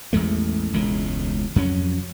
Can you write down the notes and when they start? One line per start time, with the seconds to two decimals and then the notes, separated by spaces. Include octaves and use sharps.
0.13 A1 E2 G#3 A3
0.73 E1 C#2 A2 G#3
1.56 F2 F#3 C#4